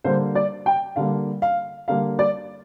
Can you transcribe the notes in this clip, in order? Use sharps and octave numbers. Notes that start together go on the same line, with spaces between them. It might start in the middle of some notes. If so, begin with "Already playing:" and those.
D3 G3 A#3 C5
D5
G5
D3 G3 A#3 F5
F5
D3 G3 A#3 F5
D5